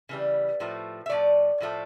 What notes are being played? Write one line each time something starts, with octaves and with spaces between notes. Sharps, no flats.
C#3 E3 G3
A2 F3 A3
E5
A2 F3 A3 D5
A2 F3 A3